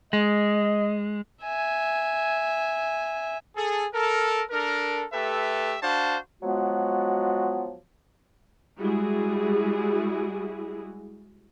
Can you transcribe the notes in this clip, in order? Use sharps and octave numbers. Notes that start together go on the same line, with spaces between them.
G#3 D#5
E5 G#5
G#4 A4
A4 A#4
D4 A4 A#4
A3 G4 A4 B4 E5
D4 F#4 C5 F5 A5
F3 F#3 G#3 B3 F4 F#4
G3 G#3 E4 F#4 G#4